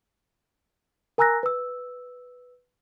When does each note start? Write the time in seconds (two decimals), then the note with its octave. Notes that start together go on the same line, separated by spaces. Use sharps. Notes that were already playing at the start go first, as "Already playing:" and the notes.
1.18 A#4 G#5 A#5 E6 F#6 A#6
1.43 B4 E6